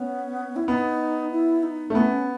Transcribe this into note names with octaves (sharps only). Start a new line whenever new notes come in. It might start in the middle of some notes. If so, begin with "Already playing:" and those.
Already playing: B3 C#4
E4
B3 D#4
E4
D#4
A3
B3 C#4